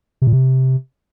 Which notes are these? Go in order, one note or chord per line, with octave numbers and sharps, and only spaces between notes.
C3
A#2
C3